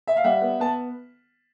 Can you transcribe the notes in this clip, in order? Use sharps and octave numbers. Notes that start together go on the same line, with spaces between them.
E5
F5
G3 E5 F#5
B3
B3 A5